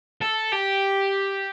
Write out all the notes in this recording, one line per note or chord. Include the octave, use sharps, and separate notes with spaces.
A4
G4